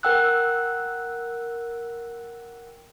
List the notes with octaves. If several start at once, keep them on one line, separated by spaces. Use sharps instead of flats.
A#4 F#5 G5 E6 F#6